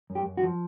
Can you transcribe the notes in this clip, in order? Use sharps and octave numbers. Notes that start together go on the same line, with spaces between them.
F#2
G4
F#2
F#4
F3